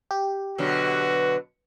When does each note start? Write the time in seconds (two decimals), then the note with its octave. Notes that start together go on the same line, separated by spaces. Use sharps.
0.11 G4
0.58 B2 D3 F#3 F#4